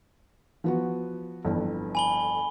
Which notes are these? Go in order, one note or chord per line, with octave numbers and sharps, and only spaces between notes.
F3 B3 F#4
G1 F2 E3
G#5 B5 G7